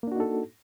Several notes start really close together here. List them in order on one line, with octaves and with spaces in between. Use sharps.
A#3 D4 F#4 D#4 A4